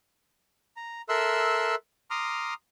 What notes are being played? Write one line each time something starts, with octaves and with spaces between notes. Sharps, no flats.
A#5
A4 A#4 E5 C6 E6 F#6
A#5 C6 D6 D#6 F6